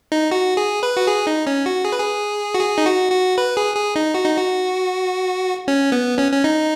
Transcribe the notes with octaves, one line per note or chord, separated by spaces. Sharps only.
D#4
F#4
G#4
B4
F#4
G#4
D#4
C#4
F#4
G#4
B4
G#4
F#4
G#4
D#4
F#4
F#4
B4
G#4
G#4
D#4
F#4
D#4
F#4
C#4
B3
C#4
C#4
D#4